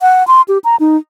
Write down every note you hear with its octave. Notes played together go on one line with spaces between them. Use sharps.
F#5
C6
G4
A#5
D#4